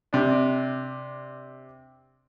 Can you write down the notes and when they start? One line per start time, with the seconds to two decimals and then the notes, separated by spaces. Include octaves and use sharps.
0.13 C3 D4